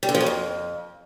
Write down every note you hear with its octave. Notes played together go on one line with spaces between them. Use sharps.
G3
D3
F3
C#3
F2